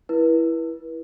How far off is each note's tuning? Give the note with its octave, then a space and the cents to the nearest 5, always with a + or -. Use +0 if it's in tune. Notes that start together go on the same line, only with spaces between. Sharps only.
E4 +5 B4 -35